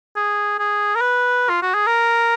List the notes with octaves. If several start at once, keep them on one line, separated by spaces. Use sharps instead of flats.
G#4
G#4
A#4
B4
F4
F#4
G#4
A#4